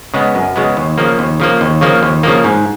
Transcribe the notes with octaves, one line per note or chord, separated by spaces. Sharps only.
C#3 G#3 B3
F#2
C#3 G#3 B3
D#2
C#3 F3 A#3
D#2
C#3 F3 A#3
D#2
C#3 F3 A#3
D#2
C#3 F3 A#3
G#2